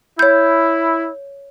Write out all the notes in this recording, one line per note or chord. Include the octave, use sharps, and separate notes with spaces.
E4 C#5 G6